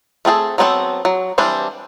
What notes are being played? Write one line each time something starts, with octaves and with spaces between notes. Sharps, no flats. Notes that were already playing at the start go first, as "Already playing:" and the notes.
A3 C4 G#4 A4
F#3 B3 C4 D4 A4
F#3
E3 G3 C4 D4